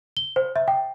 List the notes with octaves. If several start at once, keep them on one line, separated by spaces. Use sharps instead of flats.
G7
C5
E5
G5